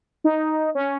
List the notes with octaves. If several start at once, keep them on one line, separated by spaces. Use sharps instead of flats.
D#4
C#4